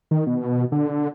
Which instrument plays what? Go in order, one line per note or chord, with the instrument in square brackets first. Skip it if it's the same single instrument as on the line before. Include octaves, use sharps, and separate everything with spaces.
[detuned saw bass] D#3
B2
D3